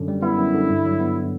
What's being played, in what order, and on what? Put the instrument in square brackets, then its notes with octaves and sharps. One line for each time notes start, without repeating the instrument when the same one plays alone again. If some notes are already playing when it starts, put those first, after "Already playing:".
Already playing: [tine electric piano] F#2 D3
G3
[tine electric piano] B3 [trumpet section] E4
[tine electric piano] F#2
D3
G2
F#3
B3